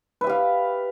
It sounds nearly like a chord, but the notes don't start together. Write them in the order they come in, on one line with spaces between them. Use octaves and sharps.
B4 E5 G4 F5